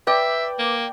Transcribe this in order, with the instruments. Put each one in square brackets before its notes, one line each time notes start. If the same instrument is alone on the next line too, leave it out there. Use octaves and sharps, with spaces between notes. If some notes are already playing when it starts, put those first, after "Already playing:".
[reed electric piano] B4 [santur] D5 G5 [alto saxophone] E5
[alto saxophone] A#3